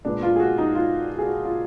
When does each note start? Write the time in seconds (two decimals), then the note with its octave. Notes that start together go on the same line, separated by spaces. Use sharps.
0.05 A#2 G#3 B3 D4
0.23 F4
0.36 G#4
0.40 F#4
0.58 D#4
0.75 F4
1.10 F#4
1.19 G#4
1.26 F#4
1.45 F4